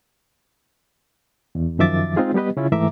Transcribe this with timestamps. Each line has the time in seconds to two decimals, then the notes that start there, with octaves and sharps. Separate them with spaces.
1.55 E2
1.79 F#2 D#3 F3 E5 D6 A6
2.16 G#3 C4 D#4 F4 G#4
2.34 G3 B3 G4 B4 D#5
2.57 C#3 C#4 E4 F4
2.72 G#2 E3 A3 E5 A#5 D6